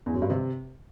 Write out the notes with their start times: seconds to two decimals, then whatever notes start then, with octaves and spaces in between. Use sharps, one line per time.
0.06 E2
0.14 F#2
0.22 G2
0.30 C3